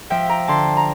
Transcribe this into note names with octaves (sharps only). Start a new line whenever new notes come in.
F3 E5 G5
G5 A#5
D3 A5 C6
A#5